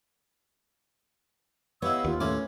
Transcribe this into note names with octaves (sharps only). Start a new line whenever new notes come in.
B3 E4 G4 C#5 D#5 F5 E6
D#2 F4
A2 C#4 E4 D6